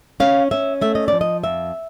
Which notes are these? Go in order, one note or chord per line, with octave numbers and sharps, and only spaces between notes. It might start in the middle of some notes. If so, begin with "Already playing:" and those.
C#4 F5
C#4 E5
A3 E5
D#5
F3 D5
D#5
F2 E5